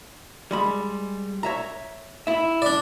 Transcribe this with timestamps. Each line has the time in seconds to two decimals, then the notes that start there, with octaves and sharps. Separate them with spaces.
0.51 G3 G#3 B5
1.43 C#5 E5 A#5
2.27 E4 E5
2.62 D4 D5